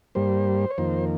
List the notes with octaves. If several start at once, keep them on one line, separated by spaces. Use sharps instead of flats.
G2 G3 A#3 C5
C#5
F2 D#3 A#3 C5